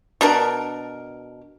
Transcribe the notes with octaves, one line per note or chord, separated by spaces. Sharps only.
B2 D4 A#4